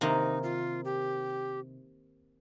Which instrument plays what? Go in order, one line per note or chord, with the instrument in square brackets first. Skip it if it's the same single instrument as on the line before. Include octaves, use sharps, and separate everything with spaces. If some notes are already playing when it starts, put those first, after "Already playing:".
[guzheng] C3 D#3 A#3 [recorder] D#4
[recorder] F4
G4